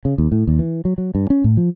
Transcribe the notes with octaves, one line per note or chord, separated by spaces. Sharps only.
C#3
D#2
A2
D#2
E3
F#3
F#3
G2
C#4
A2
F3